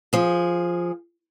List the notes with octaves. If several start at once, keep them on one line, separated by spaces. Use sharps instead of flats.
F3 G#4